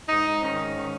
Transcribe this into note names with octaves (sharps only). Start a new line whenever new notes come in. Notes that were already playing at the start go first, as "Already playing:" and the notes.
G#2 D#4
G#2
D#3 C#4
G#2
D#3